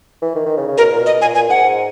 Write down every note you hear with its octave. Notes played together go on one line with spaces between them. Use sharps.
E3
D#3
D#3
C#3
C#3
B2 A#4
A#2
B2
D#5
A#2 G#5
A#2 G#5
G#2 F#5
G#2